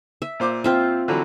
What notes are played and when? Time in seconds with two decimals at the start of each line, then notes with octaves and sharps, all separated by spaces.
0.22 E5
0.40 A#2 C5 D6
0.64 C4 F4 E5
1.08 D3 E3 F#3